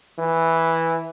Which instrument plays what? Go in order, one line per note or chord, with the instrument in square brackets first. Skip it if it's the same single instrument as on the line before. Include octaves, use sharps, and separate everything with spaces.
[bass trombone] E3